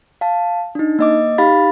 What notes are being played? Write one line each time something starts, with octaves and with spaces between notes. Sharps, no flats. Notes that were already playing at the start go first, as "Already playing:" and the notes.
F5 A5
D4 D#4
A#3 D#5 D6
D#4 G4 F5 B5 A6